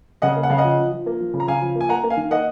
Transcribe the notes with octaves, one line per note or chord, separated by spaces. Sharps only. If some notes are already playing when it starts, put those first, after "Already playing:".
C#3 D#5 F#5
A#3
F#5
C#3 F5
D#5 F#5
F3
F3
F3
A#3
F3
C#3
A#5
C#3 F5 G#5
F3
A#3
G#5
A#3 F#5 A#5
A#3
F5 G#5
D#3
A#3 D#5 F#5